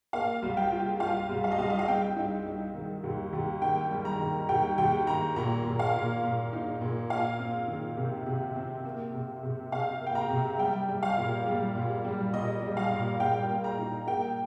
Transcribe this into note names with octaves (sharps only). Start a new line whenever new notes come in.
A#3 F5
C2
G5
F4
F4 F5
C2
F5
D#5
C2 F5
D#5
F5
C4 G5
D#4
D#4
D#3
D#2
D#2
D#3 G5
G3
A#5
D#3
D#2 G5
D#2 G5
D#3 A#5
A#2 A#5
A#2
F5
A#2
A#2
D#4
A#2
F4 F5
C4
D#3
C3
C3
C4
A#3
C3
C3
C3 F5
A#3
G5
A#5
C3
G3 G5
G3
F5
A#2
G3
A#2
G3
A#2 D#5
G3
F5
A#2
A#2 G5
A#3
A#5
D#4
A#3 G5